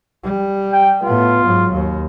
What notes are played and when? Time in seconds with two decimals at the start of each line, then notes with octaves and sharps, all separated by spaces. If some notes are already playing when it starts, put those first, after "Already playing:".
0.24 G3
0.73 G5
1.04 A2 B3 F4
1.43 G#2 F#3
1.72 D#2